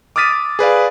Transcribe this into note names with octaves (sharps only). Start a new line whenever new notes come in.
D6 D#6 F6 A6 B6 D#7
G#4 B4 D5 F5